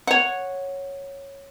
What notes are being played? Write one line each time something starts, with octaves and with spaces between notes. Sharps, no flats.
C#5 F#5